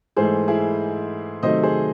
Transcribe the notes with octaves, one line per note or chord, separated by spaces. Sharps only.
G#2 E3 A3 G#4 C5
E4 G#4
C3 D#3 F#3 A3 C5 D#5
G#4 C5